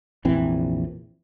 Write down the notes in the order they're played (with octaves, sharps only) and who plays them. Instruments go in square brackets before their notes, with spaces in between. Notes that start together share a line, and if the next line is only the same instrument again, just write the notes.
[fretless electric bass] F1 A#1 E3 C4